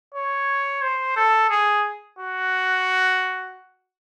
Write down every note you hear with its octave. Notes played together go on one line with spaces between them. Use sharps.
C#5
C5
A4
G#4
F#4